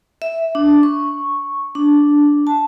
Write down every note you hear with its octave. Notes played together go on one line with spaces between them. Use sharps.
E5
D4
C#6
D4
A5